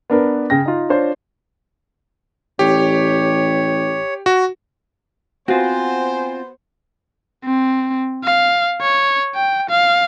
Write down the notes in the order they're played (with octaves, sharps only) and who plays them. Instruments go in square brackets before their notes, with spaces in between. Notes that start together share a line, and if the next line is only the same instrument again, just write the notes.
[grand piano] B3 D4 A#4 B4
C#3 G5 A#6
D#4 F4
D4 F4 C5 C#5 C6
[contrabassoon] A1 [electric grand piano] G4 [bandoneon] C#5
[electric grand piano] F#4
[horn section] B3 C5 [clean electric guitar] C4 F4 [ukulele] F#4 [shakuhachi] G#5
[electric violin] C4
F5
C#5
G5
F5